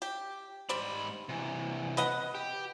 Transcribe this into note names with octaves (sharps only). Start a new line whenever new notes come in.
G4
G#2 G3 C5 D5 B5
C3 E3
B4 D#5 F#5
G4